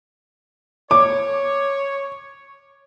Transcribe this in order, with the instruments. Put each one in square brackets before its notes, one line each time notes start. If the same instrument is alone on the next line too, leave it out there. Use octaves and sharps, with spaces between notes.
[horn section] C#5 [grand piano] D6